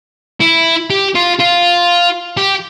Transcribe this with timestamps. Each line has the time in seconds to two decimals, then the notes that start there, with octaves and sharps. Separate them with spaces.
0.41 E4
0.90 G4
1.15 F4
1.39 F4
2.37 G4